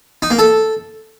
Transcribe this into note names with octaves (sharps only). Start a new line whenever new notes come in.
D#4
A#3
A4